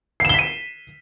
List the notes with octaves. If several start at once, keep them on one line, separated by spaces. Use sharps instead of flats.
B6 C7 D#7 E7 G7